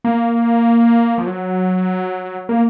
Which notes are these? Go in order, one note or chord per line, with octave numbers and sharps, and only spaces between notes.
A#3
F3
F#3
A#3